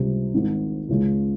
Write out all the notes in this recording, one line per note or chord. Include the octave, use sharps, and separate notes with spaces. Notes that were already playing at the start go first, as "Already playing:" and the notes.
Already playing: C#2 C3 G3
G#1 G#2 D#3
C#2 C#3 G#3